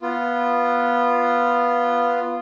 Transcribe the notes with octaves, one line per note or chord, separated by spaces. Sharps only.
B3 F4